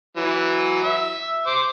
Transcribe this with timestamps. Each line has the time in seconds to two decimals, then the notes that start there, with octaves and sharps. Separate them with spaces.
0.17 E3 F#3
0.83 E5
1.47 C5 D6